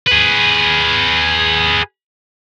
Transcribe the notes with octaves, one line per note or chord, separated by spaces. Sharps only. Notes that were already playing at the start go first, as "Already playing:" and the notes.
G#4 B4